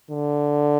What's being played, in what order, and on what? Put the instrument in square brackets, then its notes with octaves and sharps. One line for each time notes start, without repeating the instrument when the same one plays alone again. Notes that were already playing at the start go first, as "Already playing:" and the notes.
[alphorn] D3